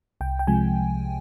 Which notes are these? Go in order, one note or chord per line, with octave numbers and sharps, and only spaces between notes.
C2 G5
G5
C3 F3 G#3 G#5